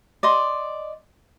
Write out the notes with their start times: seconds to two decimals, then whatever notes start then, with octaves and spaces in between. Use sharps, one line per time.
0.23 D5 D#5 C6